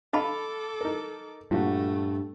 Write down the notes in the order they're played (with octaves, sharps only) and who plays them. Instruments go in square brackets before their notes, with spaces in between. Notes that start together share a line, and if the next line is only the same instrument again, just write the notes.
[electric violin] A4 D6 [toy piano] D#5 A5 B5 [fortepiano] F5
[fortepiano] D#4 A#4
[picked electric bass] G2 [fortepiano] A#2 F3 F#4 [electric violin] A3